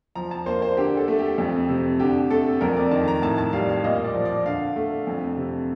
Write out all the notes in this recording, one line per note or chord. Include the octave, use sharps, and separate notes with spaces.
F3 A#5
A5
A#3 C5
C5
D3 G4
A4
A3
G4
F2
C3
D3 G4
A3 A4
F2 A#4
D5
D#3 A5
A#5
A2 A5
A5
G3 F5
F5
A#2 D#5
D5
F3
D5
D3 F5
A3
F2
C3